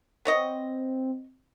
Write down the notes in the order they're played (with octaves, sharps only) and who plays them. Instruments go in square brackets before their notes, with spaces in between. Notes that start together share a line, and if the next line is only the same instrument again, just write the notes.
[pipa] B3 C#5 D#5 [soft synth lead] C4